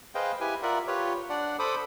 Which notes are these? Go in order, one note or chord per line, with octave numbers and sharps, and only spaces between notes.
G#4 B4 C5 D#5 F5 G5
E4 G4 B4 G#5
F4 A#4 D5 E5 F#5
F4 G4 B4 C#5
D4 D5 F#5
A4 C5 B5 D6 D#6